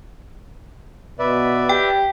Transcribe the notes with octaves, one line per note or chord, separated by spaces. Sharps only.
B2 B4 D5 E5
G4 G5